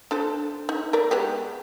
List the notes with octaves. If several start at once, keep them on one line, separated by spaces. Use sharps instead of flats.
D4 A4 C5
D#4
A#4 B4 D5
G#3 B3 G4